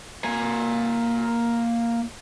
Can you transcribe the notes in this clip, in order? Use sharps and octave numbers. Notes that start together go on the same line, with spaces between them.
A#3 G#5